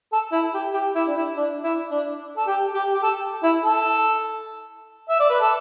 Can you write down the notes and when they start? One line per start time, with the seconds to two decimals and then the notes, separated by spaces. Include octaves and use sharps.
0.13 A4
0.32 E4
0.54 G4
0.74 G4
0.96 E4
1.08 D4
1.16 E4
1.37 D4
1.64 E4
1.91 D4
2.37 A4
2.47 G4
2.74 G4
2.94 G4
3.03 A4
3.43 E4
3.64 A4
5.09 E5
5.20 D5
5.30 B4
5.40 A4